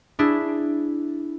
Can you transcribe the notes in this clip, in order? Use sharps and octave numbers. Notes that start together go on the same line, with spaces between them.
D4 E4 G#4